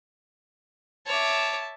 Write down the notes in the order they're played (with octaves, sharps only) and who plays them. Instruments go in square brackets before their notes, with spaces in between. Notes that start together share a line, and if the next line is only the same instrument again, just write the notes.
[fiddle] C#5 D6 [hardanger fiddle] E5 A5